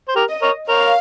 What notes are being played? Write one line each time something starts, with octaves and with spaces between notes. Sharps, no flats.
C5
G4 A#4
D#5
A#4 C#5
A#4 C#5 F5